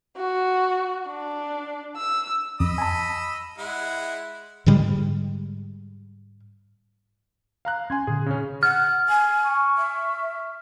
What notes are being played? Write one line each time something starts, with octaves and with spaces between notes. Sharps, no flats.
F#4
D4
E6
F2 D#5 B5 E6
G#5 A5
G#3 E4 F#5
G#2 D3 G3 G#3
F5 A#5 F#6
C#4 G#5 C6 G#6
A#2 D3 G#4
C#3 C#4
F#5 F6
G#5
C#6
E5